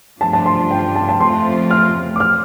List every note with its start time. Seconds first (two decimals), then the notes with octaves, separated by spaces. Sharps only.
0.21 G2 F3 A3 D4 F4 A5
0.33 A5
0.46 C6
0.71 G5
0.95 A5
1.09 A5
1.20 F2 F3 A3 C4 F4 C6
1.71 F6
2.16 D6
2.20 F6